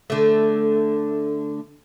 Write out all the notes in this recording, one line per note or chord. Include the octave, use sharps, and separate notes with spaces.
D3 A3